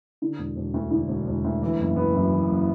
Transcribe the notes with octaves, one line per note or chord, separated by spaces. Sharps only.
D3
E1
E1
D2
D3
E1
E1
D2
E3
F#1
B3
F#2
E3
F#1